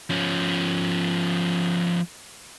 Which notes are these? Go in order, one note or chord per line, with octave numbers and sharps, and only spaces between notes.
F3 C#4